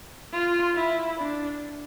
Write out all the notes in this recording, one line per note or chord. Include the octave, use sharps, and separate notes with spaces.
F4
E4
D4